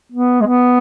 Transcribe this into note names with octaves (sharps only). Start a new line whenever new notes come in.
B3
G#3
B3